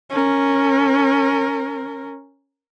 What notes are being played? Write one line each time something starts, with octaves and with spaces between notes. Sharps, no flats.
C#4 A#4